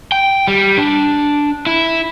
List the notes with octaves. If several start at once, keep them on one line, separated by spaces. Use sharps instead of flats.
G5
G3
D4
E4